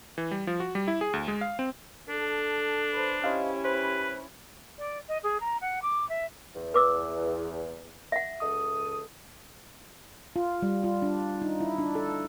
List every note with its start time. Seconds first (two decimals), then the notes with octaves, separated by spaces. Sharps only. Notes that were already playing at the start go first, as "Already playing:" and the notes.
0.18 E3
0.31 G3
0.47 F3
0.60 F#4
0.75 G3
0.88 E4
1.01 G#4
1.13 D2
1.28 G#3
1.41 F5
1.59 C4
2.09 D4 A4
2.94 B4 C5
3.24 C#4 E4 G4 C5 D#5 F5
3.65 B4 C5
4.78 D5
5.08 D#5
5.23 G#4
5.40 A#5
5.60 F#5
5.82 D6
6.09 E5
6.55 E2
6.74 B4 D6 E6
8.12 E5 F#5
8.41 C#2 A4 D#6
10.36 F4
10.62 G3
10.84 F4
11.02 D4
11.42 D#4
11.60 E4
11.78 D4
11.95 A4